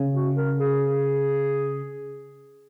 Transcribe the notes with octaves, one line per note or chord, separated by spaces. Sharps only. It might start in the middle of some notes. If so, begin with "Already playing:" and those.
Already playing: C#3
F#4
A#4
G#4